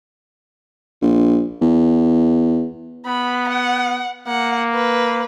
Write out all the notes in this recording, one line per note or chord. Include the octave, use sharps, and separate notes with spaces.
A#1
E2
B3 B5
F#5
A#3 F#5
B4